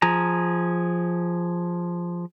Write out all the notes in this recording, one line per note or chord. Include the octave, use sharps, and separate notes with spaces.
F3 G#4 A#5